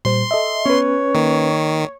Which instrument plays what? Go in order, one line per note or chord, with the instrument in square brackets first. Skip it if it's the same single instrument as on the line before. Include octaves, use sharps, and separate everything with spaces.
[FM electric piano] A#2 G3 C5 [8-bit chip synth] C6
[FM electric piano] A4 D#5 E5
[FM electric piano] B3 [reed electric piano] C#4 B4 [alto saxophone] C#5
[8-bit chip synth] D#3 [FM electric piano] A#3